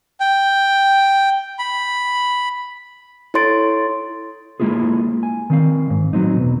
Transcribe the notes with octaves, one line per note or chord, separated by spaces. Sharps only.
G5
B5
E4 A4 C#5 C6 A6 D7
G#3 A#3 E4 F4 G#4
G#5
D#3 C4 F5
G#2
A2 F#3 C4 D#4
E2 B2